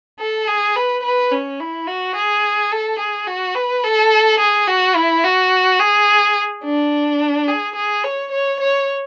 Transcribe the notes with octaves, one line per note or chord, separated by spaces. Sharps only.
A4
G#4
B4
B4
C#4
E4
F#4
G#4
A4
G#4
F#4
B4
A4
G#4
F#4
E4
F#4
G#4
D4
G#4
G#4
C#5
C#5
C#5